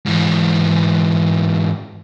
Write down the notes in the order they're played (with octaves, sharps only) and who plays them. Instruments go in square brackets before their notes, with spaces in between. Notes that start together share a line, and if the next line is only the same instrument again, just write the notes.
[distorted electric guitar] G#2 E3